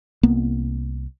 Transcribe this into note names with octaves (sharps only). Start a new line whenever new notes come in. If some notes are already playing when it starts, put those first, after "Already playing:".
C2 A#3 B3